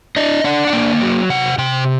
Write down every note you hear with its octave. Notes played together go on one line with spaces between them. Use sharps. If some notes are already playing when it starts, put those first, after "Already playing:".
D4 D#5
D4 F#5
F#5
A#3 G5
F#3
C3 F#5
C3 G5